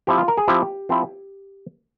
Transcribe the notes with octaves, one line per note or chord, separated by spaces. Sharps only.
F3 C4 E4 G4
F4
A#4
G#4
F3 C4 E4 G4
F3 C4 E4